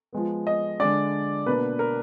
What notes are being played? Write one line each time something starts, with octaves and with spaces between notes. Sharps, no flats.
F3 G#3 B3
D#5
D3 G#3 D4 D5
B2 A#3 D4 B4
A#4